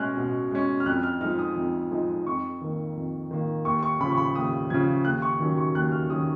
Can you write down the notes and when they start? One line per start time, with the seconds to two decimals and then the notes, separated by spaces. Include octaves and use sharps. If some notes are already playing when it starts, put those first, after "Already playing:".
Already playing: B2 G#3 C#4 F6 F#6
0.17 B2
0.51 G#3 C#4
0.80 F6
0.86 F2 F#6
1.03 F6
1.21 F3 G#3 D#4 F6
1.39 D#6
1.56 F2
1.91 F3 G#3 D#4
2.26 F2 C#6
2.61 D#3 A#3
2.96 F2
3.31 D#3 A#3
3.65 D#2 C#6
3.83 C#6
4.00 C#3 F3 B5
4.12 C#6
4.17 B5
4.35 D#2 D#6
4.70 C#3 F3 G#6
5.05 D#2 F#6
5.22 C#6
5.40 D#3 F#3 C#4
5.58 C#6
5.75 D#2 F#6
5.92 F6
6.09 D#3 F#3 C#4 D#6